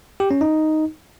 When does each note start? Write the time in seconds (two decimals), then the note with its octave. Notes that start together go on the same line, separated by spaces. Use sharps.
0.20 G4
0.31 C#4
0.41 D#4